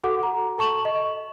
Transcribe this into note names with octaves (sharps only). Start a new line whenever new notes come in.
F#4 A4 F#5 D6
A#5
A4 A5 C#6 E7 F#7
D#5